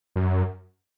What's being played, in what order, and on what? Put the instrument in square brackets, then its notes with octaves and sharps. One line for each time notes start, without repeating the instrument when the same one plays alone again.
[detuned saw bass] F#2